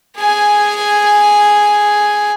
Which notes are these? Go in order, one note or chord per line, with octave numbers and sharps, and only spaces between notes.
G#4 G#5